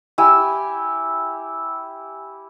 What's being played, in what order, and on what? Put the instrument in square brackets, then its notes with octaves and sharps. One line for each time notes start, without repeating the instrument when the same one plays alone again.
[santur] E4 G4 G#5 E6